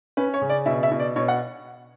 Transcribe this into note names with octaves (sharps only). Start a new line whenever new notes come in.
C#4 B4
C#5
C#3
D5
B2 E5
E5
B2
D5
B2 C#5
F#5